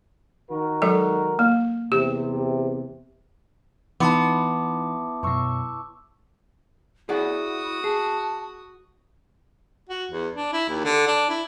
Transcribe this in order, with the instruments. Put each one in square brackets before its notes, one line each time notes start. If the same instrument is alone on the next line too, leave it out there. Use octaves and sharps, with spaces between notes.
[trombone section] D#3 F#4 A#4
[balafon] F#3 G#3 A4
A#3
[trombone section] E2 C3 [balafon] G4
[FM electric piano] E3 D#4 [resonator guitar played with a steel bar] B3 [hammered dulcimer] E4 [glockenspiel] A5 C6 D6
[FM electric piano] F#2 B2 [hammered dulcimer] E5 C#6
[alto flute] E4 [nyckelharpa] F#4 D#6 [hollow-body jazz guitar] G#4 D5 F#5
[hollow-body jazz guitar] G#4 [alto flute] A5
[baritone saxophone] F#4
E2
D4
E4
D#2
D3
D4
E4